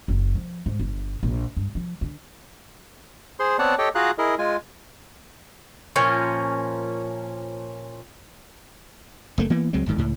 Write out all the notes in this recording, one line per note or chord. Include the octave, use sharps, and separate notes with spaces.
F#1
F3
G#2
G1
A#1
G2
F3
D3
G#4 C5 C6
B3 C4 C#5 D5 F#5 A5
G4 A4 C#5 D#5 G5
F4 F#4 G#4 F5 A#5 F#6
E4 G#4 A#4 D#5
G#3 F4 G#5
A#2 F3 C#4 A#4
F#1 A3 A#3
E3 A#3 B3
C#2 F#3 G#3 C4
D1 G1 G#2 D#3
C#2 A2